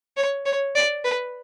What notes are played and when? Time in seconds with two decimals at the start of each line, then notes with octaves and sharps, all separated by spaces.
0.17 C#5
0.46 C#5
0.75 D5
1.04 B4